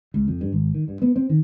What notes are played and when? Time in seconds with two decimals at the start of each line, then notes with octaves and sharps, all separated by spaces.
0.14 C#2
0.28 F2
0.41 G2
0.52 G#1
0.74 D#3
0.88 G2
1.02 B3
1.16 C4
1.29 D#3